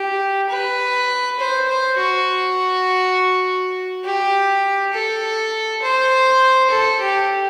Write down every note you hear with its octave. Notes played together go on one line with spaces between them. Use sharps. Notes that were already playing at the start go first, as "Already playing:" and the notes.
Already playing: G4
B4
C5
C5
F#4
G4
A4
C5
A4
G4